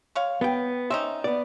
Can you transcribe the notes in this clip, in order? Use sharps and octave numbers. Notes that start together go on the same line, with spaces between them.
G#3 C#5 F5
B3 G5
C4 C#4 D#4 E5
B3 D5